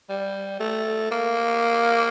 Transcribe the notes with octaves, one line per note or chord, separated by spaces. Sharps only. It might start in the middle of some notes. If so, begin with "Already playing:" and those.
G3
A3
A#3